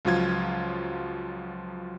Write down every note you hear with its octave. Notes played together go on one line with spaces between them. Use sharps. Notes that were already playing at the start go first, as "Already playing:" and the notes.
C#2 F3 F#3 F4 G#6